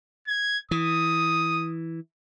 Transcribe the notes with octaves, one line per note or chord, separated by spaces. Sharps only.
G#6
E3 D#6